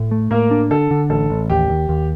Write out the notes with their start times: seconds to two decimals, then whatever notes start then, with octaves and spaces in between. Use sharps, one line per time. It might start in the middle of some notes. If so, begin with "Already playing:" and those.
Already playing: A2
0.11 A3
0.31 A2 A#3 A#4
0.51 D4
0.71 D3 A4
0.91 D3
1.10 A1 A4
1.30 A1
1.50 D#2 G4
1.70 D#2
1.89 D#2